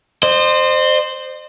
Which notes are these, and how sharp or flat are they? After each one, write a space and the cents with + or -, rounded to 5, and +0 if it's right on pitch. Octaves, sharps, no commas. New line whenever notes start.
C5 +0 D#5 -40